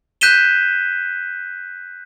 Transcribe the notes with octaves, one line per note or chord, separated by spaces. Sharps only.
F#6 G6 B6 D#7 E7 G7